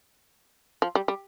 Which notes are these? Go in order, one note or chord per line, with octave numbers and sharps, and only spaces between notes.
F3
G3
G3